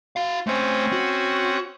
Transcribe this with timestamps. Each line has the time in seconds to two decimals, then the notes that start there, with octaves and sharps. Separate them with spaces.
0.16 F#4 F5
0.47 A3 C4 C#4 C5
0.92 F#4